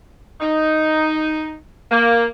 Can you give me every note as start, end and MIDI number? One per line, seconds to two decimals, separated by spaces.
0.41 1.55 63
1.91 2.24 58